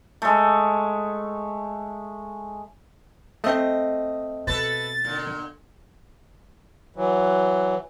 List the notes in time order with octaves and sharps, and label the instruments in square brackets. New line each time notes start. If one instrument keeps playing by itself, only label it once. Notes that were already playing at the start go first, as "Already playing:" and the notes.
[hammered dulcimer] G#3 A3
[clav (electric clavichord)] A3 C4 [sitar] D#5
[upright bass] B2 [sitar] A4 B4 [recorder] A6
[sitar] A#2 D3
[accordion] E3 F#3